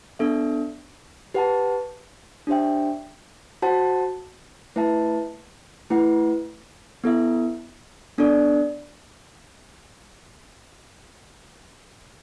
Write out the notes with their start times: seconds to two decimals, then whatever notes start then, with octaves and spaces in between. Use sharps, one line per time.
0.19 B3 D4 A4 E5
1.34 G4 B4 F#5 A5
2.47 D4 G4 C5 E5 G5
3.62 F#4 C5 F#5 A5
4.76 A3 E4 B4 E5 A5
5.90 A3 E4 B4 F#5
7.04 B3 E4 A4 E5
8.18 B3 D4 A4 D5